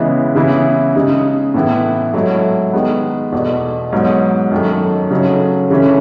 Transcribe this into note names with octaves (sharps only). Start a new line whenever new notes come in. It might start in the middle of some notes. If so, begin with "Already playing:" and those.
Already playing: C#3 E3 G#3 B3 E4
C#3 E3 B3 E4
C#3 G#3 D#4
A2 E3 B3 E4
G#2 F#3 A3 E4
D#3 G#3 B3
E2 B2 A3
G#2 F#3 B3
F#2 D#3 F#3 A3
C#3 F#3 A3 D#4
C#3 E3 A3 C#4